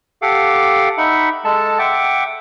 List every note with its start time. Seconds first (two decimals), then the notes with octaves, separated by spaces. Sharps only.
0.22 G4 A4 F5 F#5 D6
0.98 D#4 E5 F#5 B5
1.45 G#3 A4 A5
1.79 E5 F#5 G5 D6